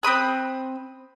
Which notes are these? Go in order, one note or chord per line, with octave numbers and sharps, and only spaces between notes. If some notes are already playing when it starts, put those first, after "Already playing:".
C4 B5 D#6 F#6